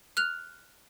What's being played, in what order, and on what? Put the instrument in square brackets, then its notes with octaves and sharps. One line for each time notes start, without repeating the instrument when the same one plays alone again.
[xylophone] F6 F#6 F7